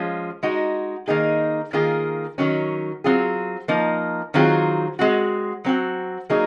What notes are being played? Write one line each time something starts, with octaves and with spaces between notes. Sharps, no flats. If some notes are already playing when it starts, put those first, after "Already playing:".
Already playing: F3 G#3 C#4 F4
G#3 D#4 F#4
D#3 A#3 D#4 G#4
D#3 A#3 F4 G#4
D#3 F#3 C#4
F#3 C4 F4 G#4
F3 A#3 D#4
D#3 F#3 C4 F4 G#4
G#3 C4 F#4
F#3 C4 F#4
F#3 A#3 D#4 G#4